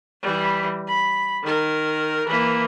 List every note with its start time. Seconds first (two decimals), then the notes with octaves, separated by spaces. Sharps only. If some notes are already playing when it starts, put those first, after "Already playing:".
0.22 E3 G3
0.88 B5
1.44 D#3 A#4
2.27 E3 A#3